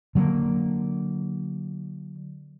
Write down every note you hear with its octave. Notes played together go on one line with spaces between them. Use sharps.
D3 F#3 G3 A#3